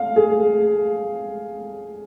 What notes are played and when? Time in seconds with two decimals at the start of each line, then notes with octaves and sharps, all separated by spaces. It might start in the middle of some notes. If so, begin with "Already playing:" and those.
Already playing: F5
0.16 G#4